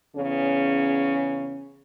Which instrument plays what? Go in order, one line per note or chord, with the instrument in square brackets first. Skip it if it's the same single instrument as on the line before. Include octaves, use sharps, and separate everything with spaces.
[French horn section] E2 C#3 C#4